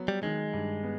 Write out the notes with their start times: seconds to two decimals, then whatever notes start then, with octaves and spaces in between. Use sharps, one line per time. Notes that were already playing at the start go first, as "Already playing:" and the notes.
Already playing: F#3 B3
0.08 G3
0.23 D#3 G#3
0.53 G2
0.83 B3